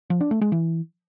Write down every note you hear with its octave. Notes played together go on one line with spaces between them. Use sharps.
F3
D4
A3
G#3
E3